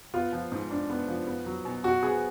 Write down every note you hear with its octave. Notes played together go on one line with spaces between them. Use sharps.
B3 F4
F3
G#2
D4
B3
F3
B3
F#3
B2
B2 F#4
B3 G#4